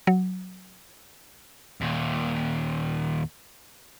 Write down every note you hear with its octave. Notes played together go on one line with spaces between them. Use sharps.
F#3
D#2 A#2